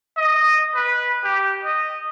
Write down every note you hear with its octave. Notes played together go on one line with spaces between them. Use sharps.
D#5
B4
G4
D#5